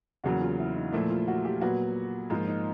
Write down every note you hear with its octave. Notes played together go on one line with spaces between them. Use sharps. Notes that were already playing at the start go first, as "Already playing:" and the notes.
E2 C#3 F#3 A#3 F#4
F4
E4
D#4
A#2 F3 A3 E4
F4
F#4
G4
A#2 F#3 B3 F#4
G#2 F3 A#3 F4
D#4